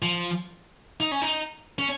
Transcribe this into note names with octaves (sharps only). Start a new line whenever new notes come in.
F3
D#4
C#4
D#4
C#4